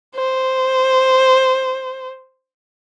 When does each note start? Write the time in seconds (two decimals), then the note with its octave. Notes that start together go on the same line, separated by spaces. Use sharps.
0.15 C5